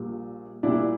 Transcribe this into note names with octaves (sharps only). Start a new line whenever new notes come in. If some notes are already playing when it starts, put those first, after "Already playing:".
Already playing: A#1 A#2 G3
A#1 A#2 G3 D4 E4